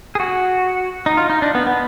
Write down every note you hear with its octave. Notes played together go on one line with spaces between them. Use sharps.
G#4
F#4
D#4
F4
D#4
D4
B3
B3